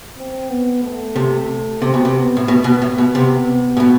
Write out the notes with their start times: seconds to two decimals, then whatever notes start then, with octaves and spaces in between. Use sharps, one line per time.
0.17 C4
0.49 B3
0.83 A3
1.16 C3
1.82 C3 C4
1.94 B2
2.05 C3
2.16 B3
2.37 A2
2.48 B2 B3
2.64 B2
2.82 A2
2.98 B2
3.15 C3
3.77 A2
3.80 B2